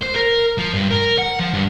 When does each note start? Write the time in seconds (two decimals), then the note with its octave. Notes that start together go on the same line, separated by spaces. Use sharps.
0.03 C5
0.16 A#4
0.58 F3
0.73 G2
0.91 A#4
1.18 F#5
1.39 F3
1.54 G2